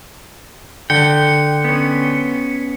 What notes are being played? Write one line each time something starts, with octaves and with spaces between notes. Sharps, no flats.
D3 G5 C#7
B3 C#4